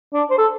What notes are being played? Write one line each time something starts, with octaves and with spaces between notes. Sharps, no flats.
D4
C5
A4